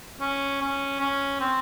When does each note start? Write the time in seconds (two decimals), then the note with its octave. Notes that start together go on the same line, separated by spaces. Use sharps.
0.21 C#4
0.62 C#4
1.01 C#4
1.41 C4